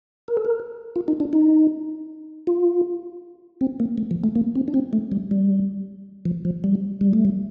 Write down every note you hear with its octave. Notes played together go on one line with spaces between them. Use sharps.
A#4
A4
A#4
F4
D#4
D4
D#4
F4
C4
A#3
A3
F3
A3
A#3
C4
D4
C4
A3
G3
G3
F3
F3
G3
G3
A3
G3